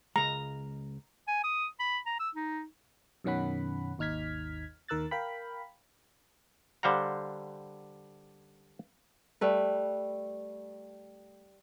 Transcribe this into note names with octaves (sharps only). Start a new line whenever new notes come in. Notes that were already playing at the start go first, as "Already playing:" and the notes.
C#2 G#3 A#5
G#5
D#6
B5
A#5
E6
D#4
F#2 B2 D#3 C#4 F#5 B5
G#1 D#2 D#4 F6 G#6 B6
D#2 D#3 A#4 E6 F#6 A6
A#4 F5 G5 B5
D3 G3 C5 F5 F#5 A#5
G3 A3 B4